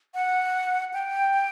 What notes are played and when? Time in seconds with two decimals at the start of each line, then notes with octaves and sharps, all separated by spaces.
0.14 F#5
0.93 G5